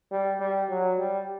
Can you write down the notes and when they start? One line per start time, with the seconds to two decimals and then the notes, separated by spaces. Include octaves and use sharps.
0.11 G3
0.40 G3
0.70 F#3
0.99 G3